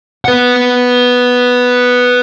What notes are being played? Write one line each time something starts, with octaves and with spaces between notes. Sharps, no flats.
B4 F#5